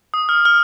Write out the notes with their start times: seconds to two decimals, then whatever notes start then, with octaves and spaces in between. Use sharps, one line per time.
0.14 D#6
0.29 F6
0.45 F6